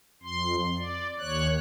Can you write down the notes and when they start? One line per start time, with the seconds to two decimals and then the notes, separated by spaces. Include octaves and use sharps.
0.23 F2 C6
0.77 D5
1.19 D#2 C#5 F#6